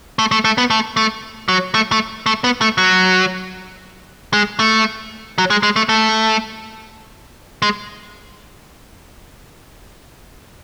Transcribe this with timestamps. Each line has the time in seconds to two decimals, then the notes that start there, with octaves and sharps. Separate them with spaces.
0.19 A3
0.32 A3
0.45 A3
0.58 B3
0.70 A3
0.97 A3
1.49 F#3
1.74 A3
1.92 A3
2.26 A3
2.44 B3
2.61 A3
2.78 F#3
4.33 G#3
4.60 A3
5.38 F#3
5.50 G#3
5.63 G#3
5.76 A3
5.89 A3
7.62 G#3